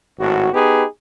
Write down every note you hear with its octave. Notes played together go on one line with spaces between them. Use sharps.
G#1 A2 F#4
B3 D#4 G4 G#4 B4